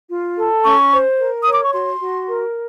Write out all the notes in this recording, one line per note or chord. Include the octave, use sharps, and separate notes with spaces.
F4
A4
C#4 C#6
C5
A#4
C#5 D#6
D6
C#6
F#4 C6
F#4
A#4